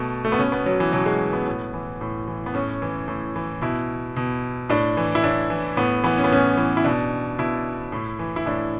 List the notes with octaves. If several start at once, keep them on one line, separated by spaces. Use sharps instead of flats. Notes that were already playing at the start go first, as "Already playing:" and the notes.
Already playing: B2 A3
A3
B3
B2 C#4
B3
F#3
E3
B2 F#3
G#3
B3
A2
E3
A2
E3
B3
A2 C#4
E3
A2
E3
B2 E4
B2
A2 D4
E3
E4
A2 D4
E3
A2 B3
E3 B3
C#4
B3
A2 C#4
E3
E4
B2 D4
B2 E4
A2
E3
E4
A2 D4